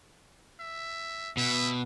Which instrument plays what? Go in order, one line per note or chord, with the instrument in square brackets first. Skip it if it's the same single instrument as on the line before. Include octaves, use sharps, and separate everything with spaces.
[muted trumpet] E5
[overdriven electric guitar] B2 [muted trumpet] E5